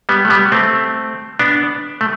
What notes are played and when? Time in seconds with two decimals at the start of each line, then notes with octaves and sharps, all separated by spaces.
0.09 G3 B3
0.25 A3
0.30 G3 B3
0.52 A3 C4
1.39 B3 D4
2.01 A3